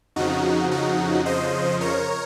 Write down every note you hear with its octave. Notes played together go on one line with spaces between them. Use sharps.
F2 C#3 F3 D#4 F#4
D#4 F#4
C5 D#5
A#4 C#5